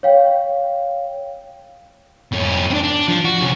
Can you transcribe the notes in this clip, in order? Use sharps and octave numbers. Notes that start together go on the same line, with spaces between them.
C#5 F5 G5
F2 C#4
C4 D4
D4
F3
F#4
C3 C#4